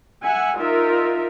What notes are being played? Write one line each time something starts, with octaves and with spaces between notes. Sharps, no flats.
E5 F#5 G#5
D#4 F4 A#4 E5